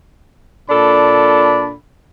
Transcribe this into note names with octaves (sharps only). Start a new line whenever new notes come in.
A#2 D4 A4 B5